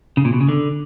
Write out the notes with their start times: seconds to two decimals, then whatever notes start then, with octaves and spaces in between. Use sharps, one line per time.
0.17 C#3
0.25 A#2
0.33 B2
0.41 C#3
0.49 D3